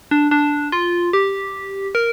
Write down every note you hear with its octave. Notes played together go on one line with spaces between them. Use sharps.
D4
D4
F4
G4
A#4